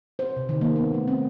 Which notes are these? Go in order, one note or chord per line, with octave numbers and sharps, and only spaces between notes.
C5
C3
D#3
A#3
B3
A3
C4